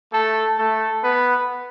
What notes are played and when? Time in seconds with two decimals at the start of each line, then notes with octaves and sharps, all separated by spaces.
0.13 A3 A4
0.58 A3 A4
1.03 B3 B4